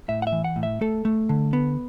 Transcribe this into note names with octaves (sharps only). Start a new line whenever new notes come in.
A2 E5
F#5
E5
E3
F#5
A2
E5
A3 A4
A3
D3
B3